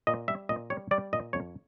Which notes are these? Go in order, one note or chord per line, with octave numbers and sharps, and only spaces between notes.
A#2 D#5
G3 E5
A#2 D#5
G3 C#5
G3 D5
A#2 D#5
F2 C#5